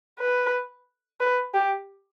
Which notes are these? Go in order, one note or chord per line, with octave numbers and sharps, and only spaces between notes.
B4
B4
G4